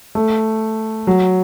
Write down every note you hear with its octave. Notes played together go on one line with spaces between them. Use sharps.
A3
F#3